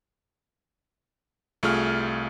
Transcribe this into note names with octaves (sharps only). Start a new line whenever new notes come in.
C2 A3 F4 G#4 F6